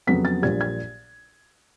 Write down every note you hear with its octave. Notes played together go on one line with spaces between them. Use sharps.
F2 C#3 F#3 B3 B6
A6
A#1 A#2 G3 G#6
G#6